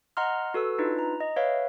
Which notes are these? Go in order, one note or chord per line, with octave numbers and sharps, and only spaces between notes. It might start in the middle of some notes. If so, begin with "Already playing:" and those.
D#5 F#5 A#5 C6 F6
F#4 A4 B4 E6
D4 D#4 F4 B4
A#5
D#5
B4 C#5 E5 F5